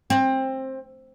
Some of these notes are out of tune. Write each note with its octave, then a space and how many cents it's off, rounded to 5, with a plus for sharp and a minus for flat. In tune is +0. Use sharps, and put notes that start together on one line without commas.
C4 +20